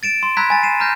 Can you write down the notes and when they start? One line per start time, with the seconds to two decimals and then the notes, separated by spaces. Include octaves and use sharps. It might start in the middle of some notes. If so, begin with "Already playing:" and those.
0.03 A6 D7 E7
0.23 C6
0.37 A#5 B5 E6 F#6 G#6 B6
0.50 G#5 A6
0.63 C7 D#7 E7
0.80 A#5 F6 G6 A#6